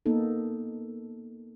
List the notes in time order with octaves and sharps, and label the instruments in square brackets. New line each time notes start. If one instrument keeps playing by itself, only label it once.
[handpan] A#3 B3 D#4 A4